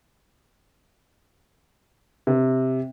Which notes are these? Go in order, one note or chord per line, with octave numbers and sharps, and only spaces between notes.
C3